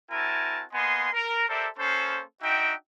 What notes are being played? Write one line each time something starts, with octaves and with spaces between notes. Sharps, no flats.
C4 E4 F#4 A#4 G#5 A5
A#3 B3 D#5 G#5 C6
A#4
G4 A4 A#4 C5 D5 E5
A#3 C#4 A4 C5
D4 D#4 F#4 E5 G5